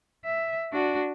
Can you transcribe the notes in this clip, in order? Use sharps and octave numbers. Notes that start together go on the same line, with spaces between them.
E5
D4 F#4